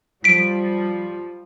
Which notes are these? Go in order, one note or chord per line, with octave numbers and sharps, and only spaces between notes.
F3 G3 B6 D7